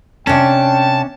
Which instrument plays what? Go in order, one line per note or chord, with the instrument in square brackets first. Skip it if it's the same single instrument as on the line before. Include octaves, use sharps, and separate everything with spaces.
[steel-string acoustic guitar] C3 C#5 [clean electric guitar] C#4 D4 [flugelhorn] G5 [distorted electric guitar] A5